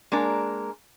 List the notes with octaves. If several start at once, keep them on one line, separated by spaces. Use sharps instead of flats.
G#3 A#3 D4 A#4